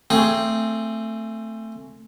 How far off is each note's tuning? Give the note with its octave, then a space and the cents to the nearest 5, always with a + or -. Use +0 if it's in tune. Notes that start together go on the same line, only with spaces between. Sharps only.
A3 +20 C4 +0 G#4 +0